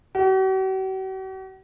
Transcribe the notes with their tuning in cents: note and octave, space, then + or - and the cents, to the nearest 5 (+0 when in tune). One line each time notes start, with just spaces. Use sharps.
F#4 +45